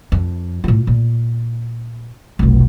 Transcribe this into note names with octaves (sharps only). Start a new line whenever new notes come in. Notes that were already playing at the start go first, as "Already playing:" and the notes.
F2
A2 F4
A#2
F1 B1